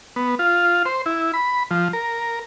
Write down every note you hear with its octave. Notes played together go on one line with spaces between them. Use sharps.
B3
F4
C5
E4
B5
F3
A#4